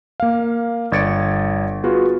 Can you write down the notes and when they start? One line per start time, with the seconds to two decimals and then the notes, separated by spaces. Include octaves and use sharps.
0.20 A#3 F5
0.92 G1 D5 G#6 A6 C#7 D7
1.83 B3 F4 F#4 G#4 B4